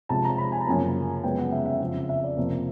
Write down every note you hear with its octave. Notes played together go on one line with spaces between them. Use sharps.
C3 F3 G#3 A5
A#5
B5
G#5
A5
F#2 C#3 F3 A#3 G#5
F#2 C#3 F3 G#3 B3 G5
F#5
E5
E5
F2 C#3 F3
E5
D5
F2 C3 F3 A#3